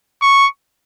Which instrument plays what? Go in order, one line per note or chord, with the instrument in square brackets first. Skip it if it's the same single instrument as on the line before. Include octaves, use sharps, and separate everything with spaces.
[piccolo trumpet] C#6